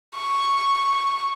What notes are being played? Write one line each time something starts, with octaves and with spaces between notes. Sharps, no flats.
C#6